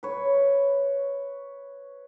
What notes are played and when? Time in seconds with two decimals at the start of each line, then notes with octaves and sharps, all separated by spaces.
0.03 B4 C#5